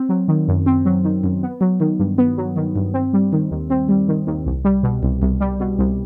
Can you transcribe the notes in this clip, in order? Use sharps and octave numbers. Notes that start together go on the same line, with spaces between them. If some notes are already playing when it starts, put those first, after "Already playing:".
Already playing: C4
F#3
D#3
F#2
C4
F#3
D#3
F#2
B3
F#3
D#3
G2
B3
F#3
D#3
G2
C4
G3
D#3
D#2
C4
G3
D#3
D#2
C2
G3
B2
C2
C2
G3
B2
C2